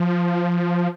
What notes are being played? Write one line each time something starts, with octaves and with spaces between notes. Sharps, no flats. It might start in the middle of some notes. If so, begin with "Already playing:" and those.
Already playing: F3